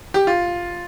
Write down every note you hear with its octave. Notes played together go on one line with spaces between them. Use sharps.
G4
F4